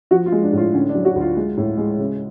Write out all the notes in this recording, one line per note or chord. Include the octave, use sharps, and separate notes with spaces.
F3 F#4
F4
G#3
D4
A2 F4
D3 C#4
D4
F#3
F#4
D2
F4
G#3
A2
G#3
C#3